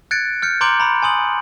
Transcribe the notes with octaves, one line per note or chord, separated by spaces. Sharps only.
F#6 G#6 A6 C#7 D7
F6 G6 C#7
A#5 C6 D6 G6 D7 F#7
A#5 B5
G#5 C6 D#6 F#7